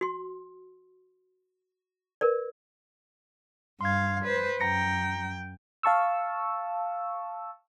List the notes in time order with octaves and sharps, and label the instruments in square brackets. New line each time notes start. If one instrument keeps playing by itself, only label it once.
[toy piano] F#4 C6
A#4 B4 D5
[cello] G2 F5 [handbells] C6 G#6
[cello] B4 C5
[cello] F#2 G5 [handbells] A#5 A#6 C#7
[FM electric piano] F5 A5 C#6 E6